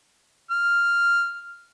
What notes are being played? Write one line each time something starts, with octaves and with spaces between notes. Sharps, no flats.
F6